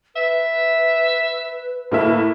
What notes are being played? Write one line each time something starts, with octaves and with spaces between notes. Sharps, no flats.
B4 E5
A2 A#3 E5